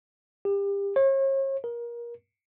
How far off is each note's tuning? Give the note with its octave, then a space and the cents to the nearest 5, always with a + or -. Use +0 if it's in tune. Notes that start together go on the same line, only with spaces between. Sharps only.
G4 +30
C#5 -40
A#4 +25